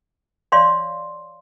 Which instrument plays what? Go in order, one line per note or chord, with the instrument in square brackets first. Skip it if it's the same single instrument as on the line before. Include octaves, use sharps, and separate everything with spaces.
[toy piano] C#5 D5 F5 C6